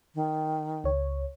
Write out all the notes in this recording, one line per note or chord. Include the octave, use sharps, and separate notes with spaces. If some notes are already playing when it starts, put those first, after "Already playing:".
D#3
C#2 C#5